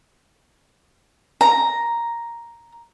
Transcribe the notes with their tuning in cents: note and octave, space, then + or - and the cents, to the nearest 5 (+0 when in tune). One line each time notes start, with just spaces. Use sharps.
A#5 +5